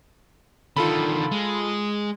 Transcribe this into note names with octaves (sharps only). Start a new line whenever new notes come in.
D3 D#3 F4 A4 B5
G#3